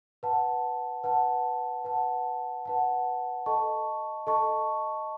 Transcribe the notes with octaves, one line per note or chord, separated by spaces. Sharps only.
B4 F#5 A5
B4 F#5 A5
B4 F#5 A5
B4 F#5 A5
A4 D#5 A5 C#6
A4 D#5 A5 C#6